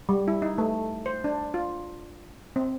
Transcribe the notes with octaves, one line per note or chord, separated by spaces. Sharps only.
G3
E4
D#4
A3
C5
D4
F4
C4